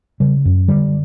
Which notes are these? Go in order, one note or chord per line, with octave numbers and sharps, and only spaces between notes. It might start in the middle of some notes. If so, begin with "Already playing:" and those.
C#3 G3
F#2
D3 G3